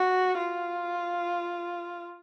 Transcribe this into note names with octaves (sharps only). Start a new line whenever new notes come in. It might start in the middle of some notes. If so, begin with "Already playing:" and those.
Already playing: F#4
F4